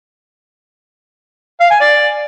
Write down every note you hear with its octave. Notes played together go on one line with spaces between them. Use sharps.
F5
G#5
D5